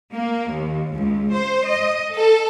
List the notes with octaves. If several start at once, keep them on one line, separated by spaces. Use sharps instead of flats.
A#3
D#2
C#2
C5
D#5
A4